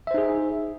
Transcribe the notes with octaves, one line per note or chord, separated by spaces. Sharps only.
D#4 G#4 C5 E5